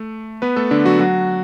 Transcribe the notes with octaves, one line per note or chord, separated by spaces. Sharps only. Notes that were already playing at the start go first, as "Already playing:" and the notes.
Already playing: A3
B3 B4
A3 A4
D3 D4
F#3 F#4
F#3 F#4